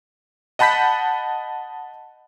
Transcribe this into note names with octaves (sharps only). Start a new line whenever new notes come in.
D#5 F#5 A5 B5 G6 B6